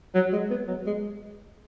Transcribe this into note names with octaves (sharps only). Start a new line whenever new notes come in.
F#3
G#3
B3
F#3
G#3